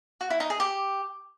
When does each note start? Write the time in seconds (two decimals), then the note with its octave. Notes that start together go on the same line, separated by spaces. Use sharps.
0.21 F#4
0.30 E4
0.40 D#4
0.50 G#4
0.60 G4